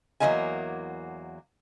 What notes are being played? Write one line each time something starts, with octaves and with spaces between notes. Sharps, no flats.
E2 F#3 A3 A#3 D#5 G#5